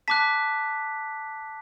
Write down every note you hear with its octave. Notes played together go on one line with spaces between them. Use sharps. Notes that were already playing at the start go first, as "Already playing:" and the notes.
A5 D6 F#6 B6